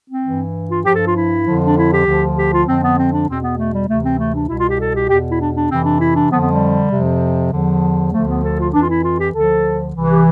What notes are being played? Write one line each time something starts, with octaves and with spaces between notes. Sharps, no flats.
C4
G2 E3
F4
G2 F3 G4
A4
F4
E4
F2 D3 F3
D4
E4
G4
D2 D3 F3
G4
F4
F2 D3 F3 C4
B3
C4
D4
E2 B2 C4
B3
A3
G3
D2 C3 E3 A3
C4
A3
D4
C2 B2 E4
F4
G4
A4
G4
E2 B2 G4
E4
D4
D4
F2 C3 E3 C4
D4
E4
D4
F2 D3 F3 B3
B3
G3
F2 C3 F3
E2 D3 F3
D2 D3 F3 A3
B3
A4
F4
F2 E3 D4
F4
E4
F4
G4
D2 D3 F3 A4
C2 C3 E3
G4